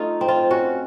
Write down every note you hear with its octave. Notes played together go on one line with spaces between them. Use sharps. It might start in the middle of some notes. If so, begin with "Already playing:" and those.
Already playing: A3 D#4 F4
C4
F4
C#4 F#4